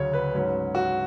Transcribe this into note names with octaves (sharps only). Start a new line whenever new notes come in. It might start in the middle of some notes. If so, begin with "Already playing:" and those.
Already playing: D2 C#3 F#3 C#4 C#5
B4
G#2 F#3 C#4
F#4